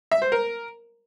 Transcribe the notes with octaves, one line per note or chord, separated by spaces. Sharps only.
E5
C5
A#4